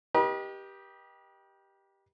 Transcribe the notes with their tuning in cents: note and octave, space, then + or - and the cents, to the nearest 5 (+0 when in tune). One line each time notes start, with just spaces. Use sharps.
G4 +0 B4 -45 D#5 +0